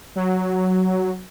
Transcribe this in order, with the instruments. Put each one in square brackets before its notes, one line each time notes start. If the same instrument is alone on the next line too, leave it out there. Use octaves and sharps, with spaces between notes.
[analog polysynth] F#3